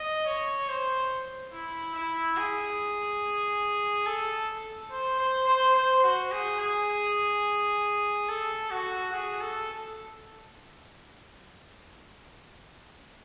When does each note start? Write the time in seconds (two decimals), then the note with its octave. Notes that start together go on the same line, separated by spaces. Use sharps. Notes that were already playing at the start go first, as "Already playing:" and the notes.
Already playing: D#5
0.26 C#5
0.69 C5
1.53 E4
1.95 E4
2.37 G#4
4.06 A4
4.91 C5
5.19 C5
5.47 C5
5.76 C5
6.03 F#4
6.32 G#4
6.60 G#4
8.28 A4
8.71 F#4
9.13 G#4
9.41 A4